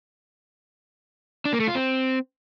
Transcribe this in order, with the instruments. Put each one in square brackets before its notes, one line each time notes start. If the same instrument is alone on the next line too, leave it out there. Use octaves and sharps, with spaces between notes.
[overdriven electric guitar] D4
A#3
A3
F4
C4